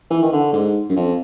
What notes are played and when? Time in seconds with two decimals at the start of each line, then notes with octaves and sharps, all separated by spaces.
0.11 E3
0.22 D#3
0.33 D3
0.53 G#2
0.89 F#2
0.96 F2